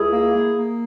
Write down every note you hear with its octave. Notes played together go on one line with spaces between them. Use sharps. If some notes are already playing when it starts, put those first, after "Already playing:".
Already playing: C#2 E4 G#4
A#3
A#3
A#3